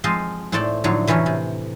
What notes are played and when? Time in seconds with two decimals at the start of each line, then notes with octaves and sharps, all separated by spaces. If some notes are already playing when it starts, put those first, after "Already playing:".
0.04 F3 G#3 C4 F4 C5 D#5
0.52 A2 A3 C4 A4 D5
0.84 A2 D3 F3 F#3
1.07 C3 E3 F#3 A3 C#4
1.26 C3